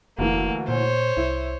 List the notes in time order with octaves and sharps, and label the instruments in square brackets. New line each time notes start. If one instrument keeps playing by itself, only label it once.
[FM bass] F1 [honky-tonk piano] D2 E3 [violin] A#3
[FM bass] A#2 [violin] C5 C#5
[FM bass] C2 [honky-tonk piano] E4